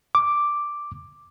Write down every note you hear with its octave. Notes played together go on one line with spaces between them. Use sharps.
D6